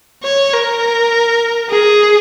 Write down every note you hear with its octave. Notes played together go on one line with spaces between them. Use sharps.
C#5
A#4
G#4